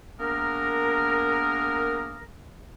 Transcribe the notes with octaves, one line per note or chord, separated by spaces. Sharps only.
A#3 B3 D4 G#4 A#4